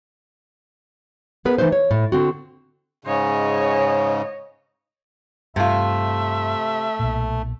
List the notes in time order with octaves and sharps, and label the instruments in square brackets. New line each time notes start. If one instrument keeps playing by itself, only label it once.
[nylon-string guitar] B3 G#4 A#4 B4
E3 A3 D#4 B4 C5
C#5
A2
D3 C4 F#4
[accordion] G#2 C#3 [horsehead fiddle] C#5 D#5
[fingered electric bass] G2 [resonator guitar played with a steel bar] C3 F4 [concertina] A3 [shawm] E5
[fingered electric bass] B1 A#2